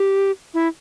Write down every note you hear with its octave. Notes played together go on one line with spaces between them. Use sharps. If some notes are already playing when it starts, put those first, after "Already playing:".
Already playing: G4
E4